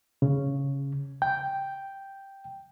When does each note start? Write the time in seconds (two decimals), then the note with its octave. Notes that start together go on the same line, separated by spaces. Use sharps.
0.22 C#3
1.22 G5